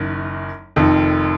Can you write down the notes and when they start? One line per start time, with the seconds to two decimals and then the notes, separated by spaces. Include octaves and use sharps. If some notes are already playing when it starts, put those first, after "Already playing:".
Already playing: F#1 F#2 D#3
0.76 F1 F2 D#3